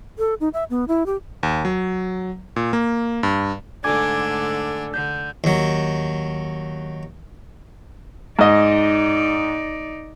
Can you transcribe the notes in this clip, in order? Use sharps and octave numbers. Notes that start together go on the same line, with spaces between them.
A4
D#4
E5
B3
E4
G4
D#2
F#3
A#2
A#3
G2
G#2 D3 A3 D4 A4 G#5 D6 G#6
D3 G6
D#2 F#3
G#2 D#4 D5 D#5